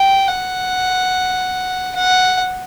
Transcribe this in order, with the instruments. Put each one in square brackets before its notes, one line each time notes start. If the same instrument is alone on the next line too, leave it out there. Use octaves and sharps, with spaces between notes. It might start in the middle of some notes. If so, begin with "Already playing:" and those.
Already playing: [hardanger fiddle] G5
F#5
F#5